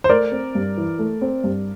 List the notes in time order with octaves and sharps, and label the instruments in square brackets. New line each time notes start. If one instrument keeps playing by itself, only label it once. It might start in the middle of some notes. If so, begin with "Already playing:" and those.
[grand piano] C5
[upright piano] A3 [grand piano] A#4 D5
[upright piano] C4
G2
E3
A3
C4
G2